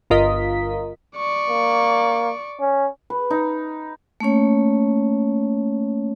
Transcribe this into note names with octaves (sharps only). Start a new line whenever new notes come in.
G1 F4 A#4 D#5 B6
D5 C#6
A#3
C#4
B4
D#4
A3 A#3 C#4 C#5